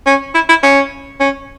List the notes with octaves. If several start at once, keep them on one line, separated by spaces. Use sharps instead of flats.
C#4
E4
E4
C#4
C#4